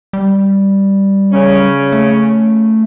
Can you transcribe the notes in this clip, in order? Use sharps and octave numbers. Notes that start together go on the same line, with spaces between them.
G3
C#3 C#4
A3